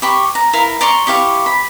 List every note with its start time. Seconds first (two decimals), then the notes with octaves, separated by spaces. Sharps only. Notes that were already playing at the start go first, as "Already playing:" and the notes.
0.02 G4 B5 C#6
0.35 A#5
0.53 E4 A#4 F5 A#5
0.81 D5 A#5 C6 C#6
1.07 E4 G4 F5 C#6
1.46 B5